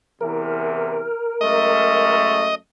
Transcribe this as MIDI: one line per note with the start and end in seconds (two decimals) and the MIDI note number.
0.21 1.08 40
0.21 1.08 48
0.21 1.08 52
0.21 2.16 70
1.41 2.54 42
1.41 2.54 56
1.41 2.54 57
1.41 2.55 75